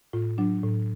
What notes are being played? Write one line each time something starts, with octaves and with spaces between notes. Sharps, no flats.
A2 F4
F#3 D4
A2